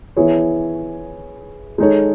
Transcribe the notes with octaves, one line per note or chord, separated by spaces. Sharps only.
E3 B3 E4 G#4 C#5
G#3 D#4 A4 C#5